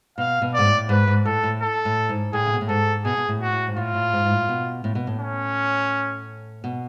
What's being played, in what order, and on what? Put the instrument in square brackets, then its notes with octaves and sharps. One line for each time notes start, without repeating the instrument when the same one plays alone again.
[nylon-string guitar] B2 [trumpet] F5
[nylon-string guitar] B2
[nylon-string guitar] G#2 [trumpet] D5
[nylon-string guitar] A2
[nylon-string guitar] G#2 [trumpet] B4
[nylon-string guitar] G#2
[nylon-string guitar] A2 [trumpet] A4
[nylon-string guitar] A2
[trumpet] A4
[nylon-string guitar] A2
G#2
[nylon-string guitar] A2 [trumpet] G#4
[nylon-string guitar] C#3
B2
A2
[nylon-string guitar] G#2 [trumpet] A4
[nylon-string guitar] B2 [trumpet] G#4
[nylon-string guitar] B2
A2
[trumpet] F#4
[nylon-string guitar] A2
G#2
[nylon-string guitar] A2 [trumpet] F4
[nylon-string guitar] A2
G#2
G#2
A2
B2
A2
B2
A2
[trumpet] C#4
[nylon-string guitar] B2